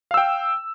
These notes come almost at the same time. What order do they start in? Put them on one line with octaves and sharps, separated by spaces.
F5 E6 G5